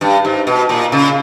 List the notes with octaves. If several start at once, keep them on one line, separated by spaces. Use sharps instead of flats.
G2
G#2
B2
A#2
C#3